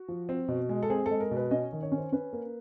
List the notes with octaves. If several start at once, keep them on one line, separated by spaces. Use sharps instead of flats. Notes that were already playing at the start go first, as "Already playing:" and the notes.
Already playing: F#4
F3
C4
B2
G#3
A4
C4 G#4
A4
G#3
A#4
B2
B4
C#4 D#5
D#3
C#5
C#4
C5
C#4 B4
A#3